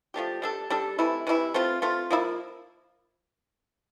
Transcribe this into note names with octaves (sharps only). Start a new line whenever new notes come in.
F3 A3 D4 G4
G3 D4 A4
G3 D4 A4
C3 E3 A3 E4
C3 E3 A3 E4
A3 C4 F4
A3 C4 F4
F3 A#3 E4